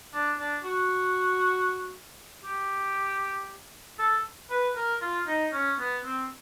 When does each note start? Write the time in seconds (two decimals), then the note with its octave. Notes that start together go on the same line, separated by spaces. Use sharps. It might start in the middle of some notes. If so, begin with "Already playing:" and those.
0.13 D4
0.38 D4
0.64 F#4
2.44 G4
3.98 A4
4.50 B4
4.76 A#4
5.01 F4
5.27 D#4
5.53 C#4
5.79 B3
6.05 C4